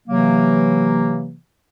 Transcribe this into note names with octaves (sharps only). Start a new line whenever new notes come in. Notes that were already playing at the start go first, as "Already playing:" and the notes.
C3 E3 F#3 A#3